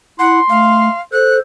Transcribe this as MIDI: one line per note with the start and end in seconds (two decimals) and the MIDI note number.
0.19 0.40 64
0.19 0.39 78
0.19 1.02 84
0.50 0.89 57
0.50 1.01 77
1.12 1.39 69
1.12 1.39 72
1.12 1.36 90